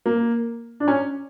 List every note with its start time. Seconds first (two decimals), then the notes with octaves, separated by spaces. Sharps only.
0.06 A#3
0.80 D4
0.88 C#4